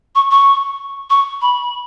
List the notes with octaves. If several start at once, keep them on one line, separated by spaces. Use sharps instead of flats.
C#6
C#6
C#6
B5